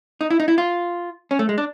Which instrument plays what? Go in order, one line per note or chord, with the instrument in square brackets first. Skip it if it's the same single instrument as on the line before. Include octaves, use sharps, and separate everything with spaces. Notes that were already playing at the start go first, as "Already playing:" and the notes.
[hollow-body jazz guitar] D#4
E4
D#4
E4
F4
C#4
A3
G#3
D4